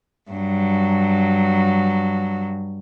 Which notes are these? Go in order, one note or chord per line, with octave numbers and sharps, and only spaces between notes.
G2 F#3